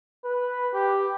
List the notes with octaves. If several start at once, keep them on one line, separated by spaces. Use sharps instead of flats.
B4
G4